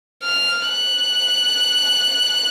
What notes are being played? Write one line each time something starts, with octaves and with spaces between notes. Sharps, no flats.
F6
F#6